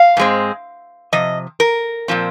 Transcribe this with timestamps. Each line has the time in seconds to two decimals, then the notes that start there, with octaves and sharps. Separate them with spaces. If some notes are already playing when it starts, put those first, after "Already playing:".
Already playing: F5
0.17 G#2 G#3 C4
1.12 C3 F3 D#5
1.60 A#4
2.08 A#2 F3 C4